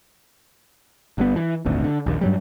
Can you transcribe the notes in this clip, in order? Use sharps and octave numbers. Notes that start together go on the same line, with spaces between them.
G1 G2 B3
E3
D#1 G#1 D2
D3
A#1 D#2
G2 F#3 G3